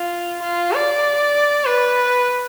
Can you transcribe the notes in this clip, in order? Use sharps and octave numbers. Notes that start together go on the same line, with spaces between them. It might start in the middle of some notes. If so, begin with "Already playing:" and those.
Already playing: F4
F4
D5
B4